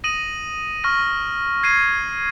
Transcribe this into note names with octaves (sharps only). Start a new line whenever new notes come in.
D#6 A#6 D#7 F#7
C#6 F6 A#6 D#7
G#6 C7 D#7